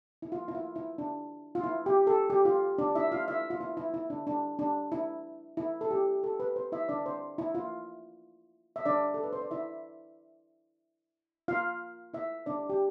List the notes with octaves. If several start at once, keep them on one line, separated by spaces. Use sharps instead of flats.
E4
F4
E4
F4
E4
D4
F4
E4
G4
A4
G4
F4
D4 D5
E4 E5
F4 F5
E4 E5
F4
E4
E4
E4
D4
D4
D4
E4
E4
A4
G4
A4
B4
C5
E4 E5
D4 D5
C5
E4
F4
E5
D4 D5
A4
B4
C5
D5
E4 E5
F4 F5
E4 E5
D4 D5
G4